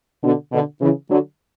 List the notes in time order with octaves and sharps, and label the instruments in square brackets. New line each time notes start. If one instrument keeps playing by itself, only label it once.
[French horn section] B2 D3
B2 D3
C#3 E3
D3 F#3